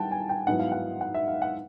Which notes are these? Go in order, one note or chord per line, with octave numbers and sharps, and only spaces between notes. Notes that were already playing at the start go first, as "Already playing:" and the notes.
Already playing: D#3 G3 E4 F#5 G5 A5
G#5
G5
G#2 D#3 F#3 B3 E4 F#5
F5
F#5
F#5
E5
F5
F#5